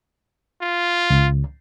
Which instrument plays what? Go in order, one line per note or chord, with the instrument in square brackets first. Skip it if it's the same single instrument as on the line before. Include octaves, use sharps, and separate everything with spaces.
[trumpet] F4
[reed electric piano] C#2